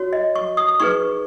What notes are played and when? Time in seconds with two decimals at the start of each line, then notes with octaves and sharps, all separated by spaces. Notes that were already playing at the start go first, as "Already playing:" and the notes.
Already playing: F#4 C#5
0.13 D#5
0.35 C#6
0.57 D#6
0.80 D#4 G#4 B4 C#6